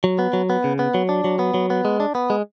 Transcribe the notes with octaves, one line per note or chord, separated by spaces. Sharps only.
F#3
B3
F#3
B3
C#3
B3
F#3
D4
F#3
B3
F#3
B3
G#3
D4
B3
G#3